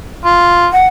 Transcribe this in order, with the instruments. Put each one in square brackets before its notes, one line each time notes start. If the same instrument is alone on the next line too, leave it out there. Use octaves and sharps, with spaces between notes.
[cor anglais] F4
[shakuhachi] F#5